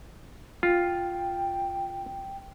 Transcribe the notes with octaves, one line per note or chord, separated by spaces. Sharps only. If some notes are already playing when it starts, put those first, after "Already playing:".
F4 G5